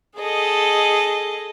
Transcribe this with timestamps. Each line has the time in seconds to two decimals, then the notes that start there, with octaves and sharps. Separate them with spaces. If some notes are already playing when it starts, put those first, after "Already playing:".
0.17 G#4 A4 D#5